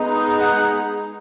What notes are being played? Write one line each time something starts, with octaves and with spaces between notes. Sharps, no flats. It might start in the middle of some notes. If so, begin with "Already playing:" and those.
Already playing: G#3 B3 D#4
F#5